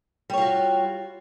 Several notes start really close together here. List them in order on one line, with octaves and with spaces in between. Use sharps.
G3 C#5 F4 F#4